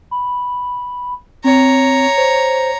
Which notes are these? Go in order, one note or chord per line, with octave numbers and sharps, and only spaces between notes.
B5
C4 C#5 A#5
C5